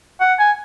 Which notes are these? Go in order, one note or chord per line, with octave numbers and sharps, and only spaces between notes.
F#5
G#5